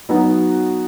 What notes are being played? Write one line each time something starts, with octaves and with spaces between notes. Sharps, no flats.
F#3 B3 D#4 F#4